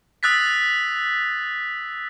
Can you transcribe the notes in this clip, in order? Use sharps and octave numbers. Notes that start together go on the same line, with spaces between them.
D#6 E6 F#6 A6 B6